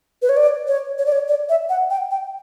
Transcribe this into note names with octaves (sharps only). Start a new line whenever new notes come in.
B4
C#5
D5
C#5
C#5
D5
C#5
D5
E5
F#5
G5
G5